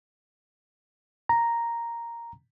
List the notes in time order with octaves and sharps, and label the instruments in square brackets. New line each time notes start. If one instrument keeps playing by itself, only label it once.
[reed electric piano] A#5